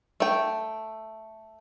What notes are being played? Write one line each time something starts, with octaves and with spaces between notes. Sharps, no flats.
A3 G5